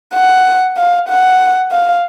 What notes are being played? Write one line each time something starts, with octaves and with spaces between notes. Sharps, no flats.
F#5
F5
F#5
F5